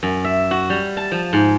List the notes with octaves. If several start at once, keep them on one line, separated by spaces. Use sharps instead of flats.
F#2
E5
F#4
G3
A5
F3
G#2